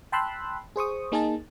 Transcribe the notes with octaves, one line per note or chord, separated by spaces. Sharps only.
G5 A5 B5 C6 E6 F#6
G#4 C5 C#6 D#6
A#3 D#4 G#4 A#4 D#5 A5